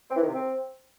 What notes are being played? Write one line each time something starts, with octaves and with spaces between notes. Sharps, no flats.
C4
E3
D#3
C3
C4